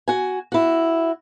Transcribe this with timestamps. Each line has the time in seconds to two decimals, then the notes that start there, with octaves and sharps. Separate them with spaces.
0.08 F#4 G#5
0.52 E4 F#4